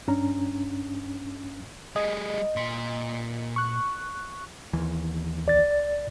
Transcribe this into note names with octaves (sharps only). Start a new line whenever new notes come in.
G2 C#4 D4 A#5
G3 G#4 D#5
A#2 C6
C#6 F#6
D#2 E3
C2 D5 A6